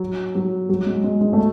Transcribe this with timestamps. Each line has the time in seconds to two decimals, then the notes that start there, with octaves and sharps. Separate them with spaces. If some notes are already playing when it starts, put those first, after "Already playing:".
Already playing: F#3
0.35 F#3
0.69 F#3
0.86 G#3
1.04 G#3
1.21 G#3
1.33 A3